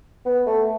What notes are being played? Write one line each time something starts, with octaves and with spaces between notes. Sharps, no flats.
B3
A3